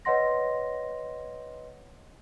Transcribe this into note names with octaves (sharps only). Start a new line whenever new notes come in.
B4 C#5 D#5 F#5 C6 A#6